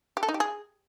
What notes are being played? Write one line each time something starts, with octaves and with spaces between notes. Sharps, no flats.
G4
A4
D#4
G4
G#4